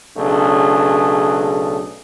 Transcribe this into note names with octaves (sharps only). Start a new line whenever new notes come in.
B1 C#3 A3 D4 G#4